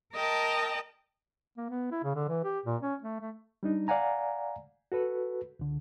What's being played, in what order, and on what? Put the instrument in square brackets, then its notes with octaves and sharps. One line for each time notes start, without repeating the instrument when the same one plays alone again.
[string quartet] A#4 D#5 G5 A5
[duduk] A#3
B3
E4
C#3
D3
E3
G4
A#2
C#4
A3
A3
[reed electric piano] G3 D4 D#4
D5 F5 F#5 G#5 A#5
F#4 A4 B4
C#2 D3